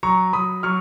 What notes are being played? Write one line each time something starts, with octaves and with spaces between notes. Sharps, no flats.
F#3 A#5 C#6
F#3 B5 D#6
F#3 C#6 F6